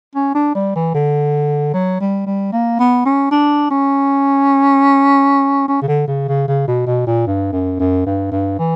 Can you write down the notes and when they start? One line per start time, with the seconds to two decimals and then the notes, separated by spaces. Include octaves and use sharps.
0.15 C#4
0.35 D4
0.55 G3
0.75 E3
0.95 D3
1.73 F#3
2.00 G3
2.26 G3
2.53 A#3
2.79 B3
3.05 C#4
3.31 D4
3.71 C#4
5.68 C#4
5.82 C#3
5.88 D3
6.07 C#3
6.28 C#3
6.48 C#3
6.67 B2
6.87 B2
7.07 A#2
7.27 G2
7.52 F#2
7.79 F#2
8.06 G2
8.31 G2
8.59 E3